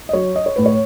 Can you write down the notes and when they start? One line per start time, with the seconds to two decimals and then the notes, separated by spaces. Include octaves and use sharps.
0.09 D#5
0.13 F#3 C#5
0.36 D#5
0.46 C#5
0.56 A2 B4
0.66 C#5